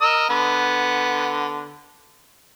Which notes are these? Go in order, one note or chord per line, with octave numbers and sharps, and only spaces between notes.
A#4 D#5 E6
D3 B3